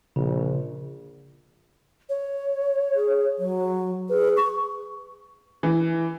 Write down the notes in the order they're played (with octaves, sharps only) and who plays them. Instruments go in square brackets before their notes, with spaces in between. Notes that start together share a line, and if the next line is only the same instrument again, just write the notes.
[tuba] A#1 [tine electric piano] C#3
[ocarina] C#5
[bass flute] G#4
F#3
[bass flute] G#4 [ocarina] B4
[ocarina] C#6
[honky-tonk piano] E3